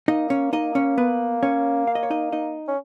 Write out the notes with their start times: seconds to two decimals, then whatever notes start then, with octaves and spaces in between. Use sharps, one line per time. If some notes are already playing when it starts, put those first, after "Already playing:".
0.08 A#3 D#4 D#5
0.30 C#4 C#5
0.53 A#3 D#4 D#5
0.75 C#4 C#5
0.98 B3 B4
1.43 C#4 C#5
1.87 F5
1.95 D#5
2.03 C#5
2.10 D#4 D#5
2.32 D#4 D#5
2.68 C#4